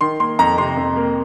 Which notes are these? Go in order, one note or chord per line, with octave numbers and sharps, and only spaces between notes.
D#3 C6
A#3 C6
F2 A#5
C3 C6
F2
A#3